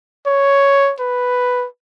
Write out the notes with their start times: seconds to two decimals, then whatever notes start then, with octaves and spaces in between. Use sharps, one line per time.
0.26 C#5
0.99 B4